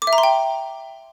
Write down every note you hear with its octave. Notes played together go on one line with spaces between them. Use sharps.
D6
E5
A#5
C6
G5